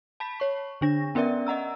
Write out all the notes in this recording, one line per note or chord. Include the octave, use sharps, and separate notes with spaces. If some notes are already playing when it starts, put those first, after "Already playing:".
A5 B5 B6
C#5 C#6
D3 D4 A#6
B3 C#4 A#4 D5 E5
D#5 F#5 A#5 E6